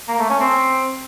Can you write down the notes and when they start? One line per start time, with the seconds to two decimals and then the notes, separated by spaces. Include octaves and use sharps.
0.08 A#3
0.19 A3
0.30 C#4
0.41 C4